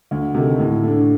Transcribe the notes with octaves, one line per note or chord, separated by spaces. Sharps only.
D2
C3 D#3 A3
A2
A3 D4